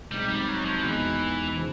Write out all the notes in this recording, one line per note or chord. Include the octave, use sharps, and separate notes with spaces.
B1 B2 G3 G#3 C4 D#4
G3
F#3
F3
E2 B2 E3 G#3 B3 D#4
C#3 F3